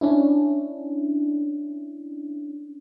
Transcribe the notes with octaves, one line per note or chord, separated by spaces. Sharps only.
C#4 D4 E4